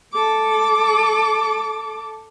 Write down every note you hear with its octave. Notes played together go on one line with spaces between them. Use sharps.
A4 D6